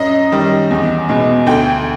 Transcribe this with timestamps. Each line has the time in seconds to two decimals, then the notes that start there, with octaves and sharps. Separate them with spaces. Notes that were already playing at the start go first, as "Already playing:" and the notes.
Already playing: F#2 D#5
0.32 D#3 G3
0.71 E2
1.09 B2 G#3
1.47 D2 G5